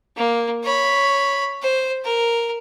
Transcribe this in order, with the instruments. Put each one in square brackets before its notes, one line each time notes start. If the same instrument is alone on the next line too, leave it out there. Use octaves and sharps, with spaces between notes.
[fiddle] A#3
C#5 B5
C5
A#4